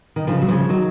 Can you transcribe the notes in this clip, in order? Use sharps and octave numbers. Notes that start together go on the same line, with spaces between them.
D#3
C#3 F3
F#3
C#3 F3
D#3 F#3